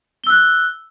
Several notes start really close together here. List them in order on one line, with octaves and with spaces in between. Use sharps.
G7 E6 F#6